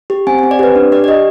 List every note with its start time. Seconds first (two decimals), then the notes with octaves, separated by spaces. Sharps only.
0.10 G4
0.27 C4 G#5
0.39 G#5
0.43 C4
0.51 D5
0.59 G4 B4
0.76 D4
0.92 G4 D5
1.04 D5
1.08 G4 D#5